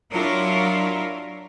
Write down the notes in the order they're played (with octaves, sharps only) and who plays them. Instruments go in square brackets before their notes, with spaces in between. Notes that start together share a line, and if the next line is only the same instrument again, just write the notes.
[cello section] F#3 D4 E4 F4 A#4 C#5